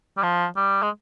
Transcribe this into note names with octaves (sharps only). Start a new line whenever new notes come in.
G3
F3
G3
G#3